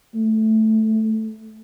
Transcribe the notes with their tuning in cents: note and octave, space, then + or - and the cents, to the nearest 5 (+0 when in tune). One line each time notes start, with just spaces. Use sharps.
A3 -5